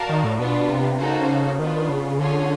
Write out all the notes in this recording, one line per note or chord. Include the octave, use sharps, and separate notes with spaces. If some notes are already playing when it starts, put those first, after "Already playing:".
Already playing: F#4 A#4 D5 F5 A5
D#3
A2
B2 B3 D4 F4
C3
C#3 A#3 D#4 F#4 A4 C5
D#3 B3 D4 F4
C#3
D3 C#4 F4 G#4 C#5